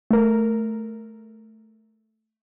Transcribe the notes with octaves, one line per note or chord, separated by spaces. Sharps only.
A3 A#4